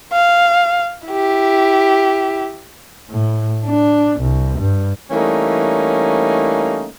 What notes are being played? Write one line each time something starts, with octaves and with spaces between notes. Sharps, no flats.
F5
E4 G4
A2
D4
C2
G2
E3 G3 A3 A#3 C#4 D#4